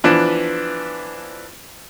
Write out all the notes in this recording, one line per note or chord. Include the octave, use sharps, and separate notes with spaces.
E3 F3 B3 D4 B4